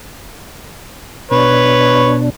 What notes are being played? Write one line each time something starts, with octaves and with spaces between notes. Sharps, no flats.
B2 D4 B4 C#5